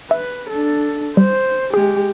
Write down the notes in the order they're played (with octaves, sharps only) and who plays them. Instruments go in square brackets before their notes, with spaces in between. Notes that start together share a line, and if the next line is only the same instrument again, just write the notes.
[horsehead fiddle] B4 [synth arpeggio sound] E5
[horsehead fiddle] D4 A4
[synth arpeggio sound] G3 [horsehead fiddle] C5
[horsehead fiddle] G#3 G4 [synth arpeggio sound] G#4